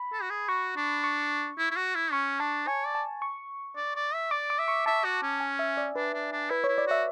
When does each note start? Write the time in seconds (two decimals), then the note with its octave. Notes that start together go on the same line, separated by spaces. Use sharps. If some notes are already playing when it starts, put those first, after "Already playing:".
Already playing: B5
0.13 A4
0.22 F#4
0.30 G#4
0.48 F#4 C#6
0.76 D4
1.04 C#6
1.58 E4
1.71 E4
1.76 F#4
1.95 E4
2.12 C#4 C#6
2.40 D4 A5
2.67 C#5 G#5
2.86 D5
2.95 A5
3.22 C#6
3.76 D5
3.96 D5
4.14 E5
4.31 D5 D6
4.50 D6
4.59 E5
4.68 C#6
4.86 E5 A5
5.04 F#4
5.22 C#4
5.40 G#5
5.59 E5
5.77 D5
5.96 D4 B4
6.14 D4
6.32 D4
6.50 E4 B4
6.64 E4 C#5
6.78 D5
6.87 F#4 E5